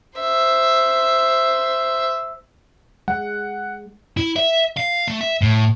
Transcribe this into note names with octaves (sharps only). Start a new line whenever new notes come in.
C5 E5
G#3 F#5
E4
E5
F5
A3
E5
A2